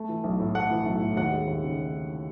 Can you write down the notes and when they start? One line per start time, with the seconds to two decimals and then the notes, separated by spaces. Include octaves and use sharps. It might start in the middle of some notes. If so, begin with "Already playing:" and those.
Already playing: A3
0.09 E3
0.24 B1
0.40 A2
0.55 A3 F#5
0.71 E3
0.86 B1
1.01 A2
1.16 D#2 F#5
1.32 G#3
1.47 D#2
1.63 C#3